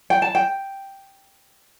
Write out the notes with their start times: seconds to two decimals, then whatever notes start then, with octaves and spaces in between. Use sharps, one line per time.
0.10 G5
0.22 A5
0.35 G5